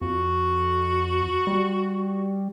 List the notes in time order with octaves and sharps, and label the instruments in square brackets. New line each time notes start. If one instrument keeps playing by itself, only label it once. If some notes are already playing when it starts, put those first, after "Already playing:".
[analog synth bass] F2 [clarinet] F#4
[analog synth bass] G3